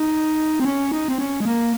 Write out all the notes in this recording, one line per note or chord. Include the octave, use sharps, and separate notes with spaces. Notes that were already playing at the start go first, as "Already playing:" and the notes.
Already playing: D#4
C4
C#4
D#4
C4
C#4
G#3
A#3